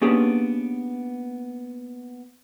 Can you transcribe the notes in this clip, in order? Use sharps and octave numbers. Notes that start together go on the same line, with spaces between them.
A#3 B3 C#4 D4 G4 G#4